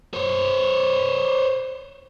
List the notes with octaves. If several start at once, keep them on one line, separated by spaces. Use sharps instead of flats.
C5 C#5